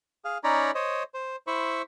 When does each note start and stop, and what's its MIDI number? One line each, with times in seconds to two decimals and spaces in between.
0.25 0.38 68
0.25 0.38 77
0.44 0.71 61
0.44 0.71 63
0.44 0.71 73
0.44 0.71 74
0.44 0.71 82
0.44 0.71 83
0.75 1.03 72
0.75 1.03 73
0.75 1.03 75
1.14 1.36 72
1.47 1.82 64
1.47 1.82 72
1.47 1.82 83
1.47 1.82 85